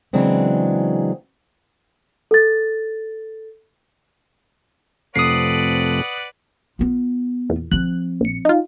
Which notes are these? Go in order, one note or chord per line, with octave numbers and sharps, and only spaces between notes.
C#3 E3 F#3 G#3 C4 D4
A4 A6
F2 C3 A3 B4 D5 F#5 D#6 C7
B3 F4
E2 A#2
F3 C4 F#6
A#1 C#7
D#4 F4